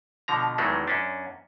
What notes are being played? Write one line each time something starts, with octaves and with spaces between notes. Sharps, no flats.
B2 D3 F3 A#5
E2 D#3 E3 F#3 G#3 A3
F#2 C#4 D4